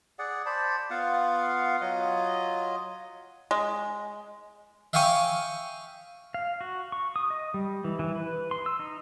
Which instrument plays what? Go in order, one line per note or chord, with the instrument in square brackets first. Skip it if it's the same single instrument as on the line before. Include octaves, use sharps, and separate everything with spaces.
[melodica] G#4 D5 F#5
C5 D5 A5 B5
B3 F4 F5 F#5
F#3 F4 D#5
[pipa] G#3
[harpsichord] E5 F5 G5 G#5 C#6 D#6
[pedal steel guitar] F5
F#4
C#6
D#6
D#5
G3
E3
E3
B4
C6
E6
D#4